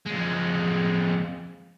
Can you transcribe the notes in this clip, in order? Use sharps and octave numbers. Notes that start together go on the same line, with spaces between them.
F2 G#3